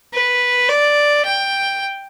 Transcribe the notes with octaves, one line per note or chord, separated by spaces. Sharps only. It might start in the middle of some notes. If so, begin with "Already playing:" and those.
B4
D5
G5